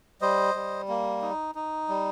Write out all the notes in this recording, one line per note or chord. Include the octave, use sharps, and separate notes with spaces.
G3 C5 D#5
G3
A#3
D#4
D#4
G3